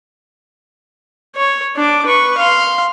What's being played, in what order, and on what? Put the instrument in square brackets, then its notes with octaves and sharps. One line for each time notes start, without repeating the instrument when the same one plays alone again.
[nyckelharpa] C#5
D4 D6
B4 C#6
F5 C6